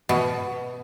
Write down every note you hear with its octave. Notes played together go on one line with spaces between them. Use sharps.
B2